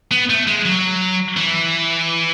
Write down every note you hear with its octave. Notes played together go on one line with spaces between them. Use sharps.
B3
A3
G#3
F#3
E3